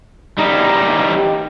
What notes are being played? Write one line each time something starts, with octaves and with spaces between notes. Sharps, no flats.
G3 D#4